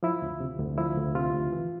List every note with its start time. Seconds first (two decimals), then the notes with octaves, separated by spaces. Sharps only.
0.03 F3 E4
0.22 D2
0.40 C3
0.59 D2
0.78 F3 E4
0.97 D2
1.15 C3 F4
1.34 D2
1.52 E3